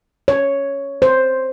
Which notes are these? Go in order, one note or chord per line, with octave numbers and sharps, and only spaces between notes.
C#5
C5